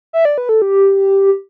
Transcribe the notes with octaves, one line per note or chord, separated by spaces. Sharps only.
E5
D5
B4
A4
G4